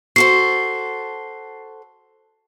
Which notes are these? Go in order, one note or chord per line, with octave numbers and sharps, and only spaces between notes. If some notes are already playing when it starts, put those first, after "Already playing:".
F#4 A4 C5 C7